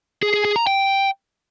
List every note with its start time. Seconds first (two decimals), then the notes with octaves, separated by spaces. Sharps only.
0.23 G#4
0.34 G#4
0.45 G#4
0.56 A#5
0.67 G5